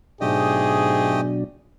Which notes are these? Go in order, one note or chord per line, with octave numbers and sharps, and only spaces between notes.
G#2 B2 F#3 A3 D4 G4 G#4 D#5